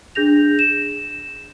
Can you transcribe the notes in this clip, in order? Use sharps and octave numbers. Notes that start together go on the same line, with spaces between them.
D4 G#4 G6 A#6 F7
E7